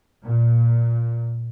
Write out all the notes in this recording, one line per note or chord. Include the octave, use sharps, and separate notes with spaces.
A#2